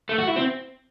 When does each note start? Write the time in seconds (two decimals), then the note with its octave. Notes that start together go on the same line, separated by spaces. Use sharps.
0.09 A3
0.18 F#4
0.28 E4
0.36 C4